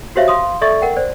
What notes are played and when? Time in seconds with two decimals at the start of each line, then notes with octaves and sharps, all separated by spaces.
0.16 F#4 G4 C5 C#5 E5 F5
0.28 F5 C6 D#6
0.61 A4 D5 E5 C#6 A6
0.82 A#4 F#5 G5
0.97 C5 D5